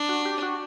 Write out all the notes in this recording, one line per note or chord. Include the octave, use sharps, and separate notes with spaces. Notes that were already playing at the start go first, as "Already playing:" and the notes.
Already playing: D4
F#4
G4
F#4